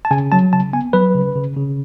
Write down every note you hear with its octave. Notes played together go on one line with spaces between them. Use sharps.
A5
C#3 G#5
F#3 A5
C#3 A5
B3 G#5
F#3 B4
C#3
C#3
C#3